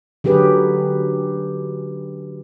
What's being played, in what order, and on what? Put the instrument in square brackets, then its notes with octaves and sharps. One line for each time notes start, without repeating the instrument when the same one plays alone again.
[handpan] D3 F#3 G4 G#4 B4